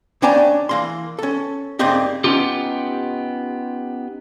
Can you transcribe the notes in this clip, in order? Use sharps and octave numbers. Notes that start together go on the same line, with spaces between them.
D#2 C#4 D4 G5 G#5 A#5
E3 A#3 C6
C#4 A4
G2 C#3 A#3 C4 D#4 G4
B3 C#4 D#4 F4 G4